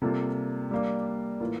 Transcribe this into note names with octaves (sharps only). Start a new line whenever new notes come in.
C3 G3 A#3 F4 A4
G3 A#3 D4
A2 E3 A#3 F4 A#4